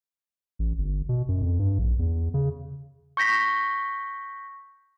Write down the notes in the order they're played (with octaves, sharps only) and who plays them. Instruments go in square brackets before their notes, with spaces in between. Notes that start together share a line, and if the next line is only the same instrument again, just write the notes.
[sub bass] A1
G1
B2
F#2
F2
G2
A#1
E2
C#3
[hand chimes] C#6 G6 A#6 B6